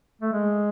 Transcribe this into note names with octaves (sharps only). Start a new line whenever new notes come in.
A3
G#3